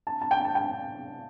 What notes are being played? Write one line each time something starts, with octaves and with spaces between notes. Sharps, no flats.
A5
A5
G5
A5
G5